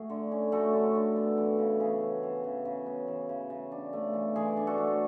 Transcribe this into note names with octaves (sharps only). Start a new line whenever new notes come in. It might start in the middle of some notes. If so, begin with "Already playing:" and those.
Already playing: A3 F#4 G#4
D3
C#4
A3 F#4 A4
D3
D3
B3
E3
C#3
C#3 G#4
B3
E3
C#3
C#3
B3
E3
C#3
C#3
D4
A3
E3
E3 G#4
D4
F#4 A4
A3